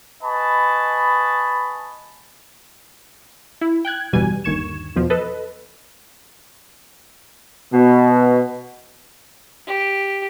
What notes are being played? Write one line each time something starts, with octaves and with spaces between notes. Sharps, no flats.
B4 D#5 G#5 A5 B5 C#6
E4
G5 F#6 G#6
G1 E2 B2 G3 G#5
G1 D#2 C#6 G#6 E7
E2 B2 F3
A4 B4 D#5
B2
G4